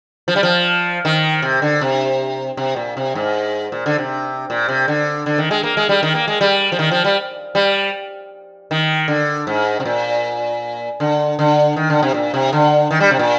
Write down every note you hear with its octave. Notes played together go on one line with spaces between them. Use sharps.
F3
G3
F3
D#3
C3
D3
C3
C3
A#2
C3
G#2
A#2
D3
C3
A#2
C3
D3
D3
D#3
G#3
A#3
G#3
G3
D#3
A#3
G#3
G3
F3
D#3
F3
G3
G3
D#3
D3
G#2
C3
A#2
D3
D3
D#3
D3
C3
A#2
C3
D3
D#3
G3
C3
A#2